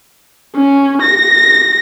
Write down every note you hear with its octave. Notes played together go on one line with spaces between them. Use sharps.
C#4
A#6